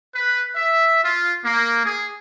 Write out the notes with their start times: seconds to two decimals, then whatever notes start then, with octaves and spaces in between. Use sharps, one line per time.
0.15 B4
0.55 E5
1.04 F4
1.45 A#3
1.85 G#4